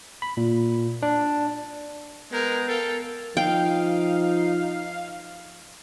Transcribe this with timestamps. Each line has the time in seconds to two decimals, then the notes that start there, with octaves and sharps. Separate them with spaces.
0.22 B5
0.37 A#2
1.03 D4
2.32 G#3 B3 A#4 G6
2.68 A4 A#4 F5 G5
3.37 F3 D#4 F5 G5